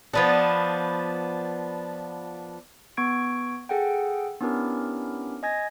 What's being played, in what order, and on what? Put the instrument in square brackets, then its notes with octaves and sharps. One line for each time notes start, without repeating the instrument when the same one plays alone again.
[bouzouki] F3 B3 D4
[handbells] B3 C#6 G#6 D7
G#4 A4 F#5 G5
B3 C#4 D4 E4 G4 A#4
D#5 G#5 G#6 A#6